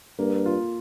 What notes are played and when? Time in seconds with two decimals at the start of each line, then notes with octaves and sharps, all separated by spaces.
0.18 G2 A#3
0.46 F4